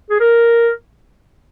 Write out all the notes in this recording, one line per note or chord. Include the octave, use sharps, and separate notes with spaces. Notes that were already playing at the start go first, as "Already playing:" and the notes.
G#4
A#4